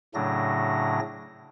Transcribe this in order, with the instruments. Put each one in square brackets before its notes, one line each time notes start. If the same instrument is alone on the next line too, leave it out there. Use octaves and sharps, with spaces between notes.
[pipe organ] A2 C#3 F#3 A3 D4 A#6